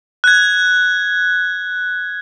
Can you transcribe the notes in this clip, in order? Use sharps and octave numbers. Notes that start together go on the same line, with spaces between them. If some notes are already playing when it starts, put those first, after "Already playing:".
F#6 G#6